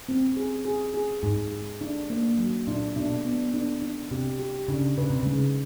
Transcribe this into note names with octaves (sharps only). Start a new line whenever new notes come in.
C4
G#4
G#4
G#4
G#2 G#4
G#4
D4
A#3
F#3
A#2 D4
B2 D4
B3
D4
D4
C3 G4
G4
C#3 D4
C#3 B4
C3
C#3 G#3